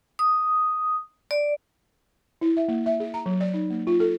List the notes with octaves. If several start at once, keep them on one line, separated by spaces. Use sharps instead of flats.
D#6
D5
E4
E5
A#3
E5
G#4
A#5
F#3
D5
D#4
A#3
F4
A4